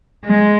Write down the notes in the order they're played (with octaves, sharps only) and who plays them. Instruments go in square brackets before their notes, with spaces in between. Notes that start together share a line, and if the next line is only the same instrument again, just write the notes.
[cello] G#3